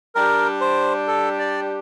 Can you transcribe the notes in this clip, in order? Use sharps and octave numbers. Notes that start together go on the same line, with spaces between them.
G3 D4 G4 A#4
C5
A4
D5